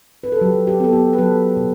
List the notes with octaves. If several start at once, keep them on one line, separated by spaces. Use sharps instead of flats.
B4
A4
F#3 G4
G4
B3 A4
G4
B4
F#3 A4
B2